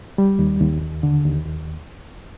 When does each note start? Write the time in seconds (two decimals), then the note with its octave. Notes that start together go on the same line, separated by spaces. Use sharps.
0.18 G3
0.39 D#2
0.61 D#2
0.82 D#2
1.03 D3
1.25 D#2
1.46 D#2